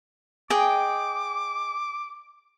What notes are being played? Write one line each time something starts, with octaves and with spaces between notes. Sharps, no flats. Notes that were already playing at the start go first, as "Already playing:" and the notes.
G#4 D#5 G5 D6